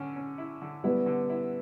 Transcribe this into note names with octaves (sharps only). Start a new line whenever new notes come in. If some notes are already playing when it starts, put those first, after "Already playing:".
Already playing: D3 C#4
C#4
E4
D3
G3 B3 E4
D3
E4